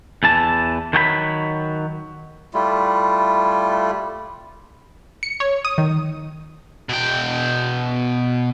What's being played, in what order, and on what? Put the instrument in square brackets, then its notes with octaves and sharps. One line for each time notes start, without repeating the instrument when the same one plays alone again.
[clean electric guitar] E2 E3 A5
D#3 F#3 G5 B5
[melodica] G3 A3 E4 F4
[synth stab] C#7
C#5
D#6
D#3
[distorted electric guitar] B2 G5